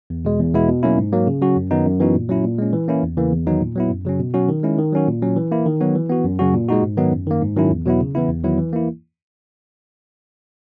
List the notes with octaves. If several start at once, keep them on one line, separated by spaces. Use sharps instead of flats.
E2
B2 G#3
E2
B2 G#3 B3 E4
B2
F#3 A#3 C#4 E4
G#2
F#3 A#3
C#3
F#3 C#4 F#4
F#2
D#3 F#3 B3 D#4
F#2
E3 B3 D#4 F#4
A#2
F#3 C#4 E4
A#2
G#3 C#4
E3
A#3 C#4 E4
E2
C#3 E3 A#3
E2
D#3 F#3 B3 D#4
A#2
F#3 B3 E4
F#2
C#3 F#3 C#4
B2
F#3 C#4 F#4
D#3
G#3 C#4 E4
D#3
F#3 C#4 F#4
A#2
F#3 C#4
E3
A#3 E4
D#3
F#3 B3 F#4
E3
B3 F#4
F#2
C#3 F#3 C#4 F#4
A#2
G#3 D#4 F#4
G#2
D#3 F#3 B3 D#4
F#2
D#3 A#3
G#2
D#3 F#3 C#4 E4
E2
B2 F#3 B3 E4
C#3
E3 B3 E4
E2
D#3 F#3 B3 E4
E3
A#3 E4